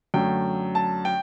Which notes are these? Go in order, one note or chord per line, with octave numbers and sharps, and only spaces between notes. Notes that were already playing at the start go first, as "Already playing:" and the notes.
F#2 D3 A3 G5
A5
G5